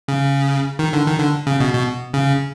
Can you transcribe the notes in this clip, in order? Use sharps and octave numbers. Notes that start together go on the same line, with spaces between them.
C#3
D#3
D3
D#3
D3
C#3
B2
B2
C#3